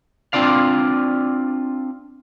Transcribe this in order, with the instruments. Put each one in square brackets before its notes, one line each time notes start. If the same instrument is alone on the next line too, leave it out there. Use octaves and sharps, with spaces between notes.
[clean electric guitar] C4 D4 F4 D5 F5